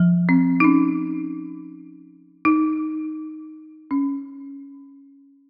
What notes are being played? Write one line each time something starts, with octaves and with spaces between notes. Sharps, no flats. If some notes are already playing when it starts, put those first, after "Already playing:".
Already playing: F3
C4
D#4
C#4
D#4
C#4